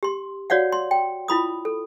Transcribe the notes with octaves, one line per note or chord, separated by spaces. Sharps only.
G4 C6
F#4 C#5 D5 F5 F#5
C6
G5
E4 F4 B5 D#6
A4